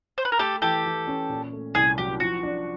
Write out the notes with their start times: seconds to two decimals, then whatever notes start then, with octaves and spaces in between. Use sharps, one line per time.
0.18 C5
0.25 B4
0.32 A#4
0.39 A3 G4 A4
0.62 E3 G4 A4
0.86 E3
1.07 C#4
1.29 A#2
1.53 A3
1.75 C2 G#4
1.98 F#3 G4
2.20 F3 F#4
2.43 D4